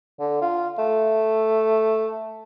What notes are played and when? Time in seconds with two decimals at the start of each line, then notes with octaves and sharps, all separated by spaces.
0.20 D3
0.41 F4
0.78 A3